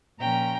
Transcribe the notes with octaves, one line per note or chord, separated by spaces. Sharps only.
A#2 F3 A#3 C#4 G5 A#5